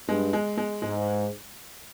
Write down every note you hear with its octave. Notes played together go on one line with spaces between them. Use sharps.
G2 G#3
G#3
G#3
G#2 G#3